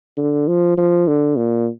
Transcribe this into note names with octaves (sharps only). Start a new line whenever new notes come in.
D3
F3
F3
D3
A#2